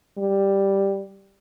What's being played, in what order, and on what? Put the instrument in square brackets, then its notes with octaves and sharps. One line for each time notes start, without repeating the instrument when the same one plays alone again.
[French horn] G3